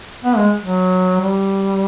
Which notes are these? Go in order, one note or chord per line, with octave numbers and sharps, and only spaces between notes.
B3
G#3
F#3
G3